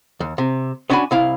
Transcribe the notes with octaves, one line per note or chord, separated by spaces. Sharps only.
D#2
C3
B3 C#4 D4 F#4 G#5 B5
C2 E4 F5